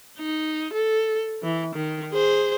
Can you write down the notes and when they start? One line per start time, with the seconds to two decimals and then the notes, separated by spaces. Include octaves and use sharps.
0.18 D#4
0.73 A4
1.43 E3
1.75 D#3
2.13 G#4 C5